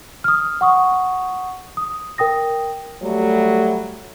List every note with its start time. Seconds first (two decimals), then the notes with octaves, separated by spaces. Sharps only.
0.24 D#6 F6
0.61 F#5 C#6 D#6
1.77 D#6
2.18 A#4 G5 D#6 A#6
3.02 F#3 G3 A3